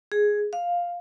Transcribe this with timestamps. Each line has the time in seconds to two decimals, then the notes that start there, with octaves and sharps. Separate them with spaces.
0.12 G#4
0.53 F5